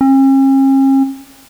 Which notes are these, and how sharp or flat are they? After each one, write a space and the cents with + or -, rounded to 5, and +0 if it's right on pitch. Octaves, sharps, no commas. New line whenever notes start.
C#4 -45